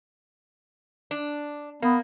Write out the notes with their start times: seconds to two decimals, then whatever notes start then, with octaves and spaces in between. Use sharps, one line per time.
1.11 D4
1.82 A#3 B3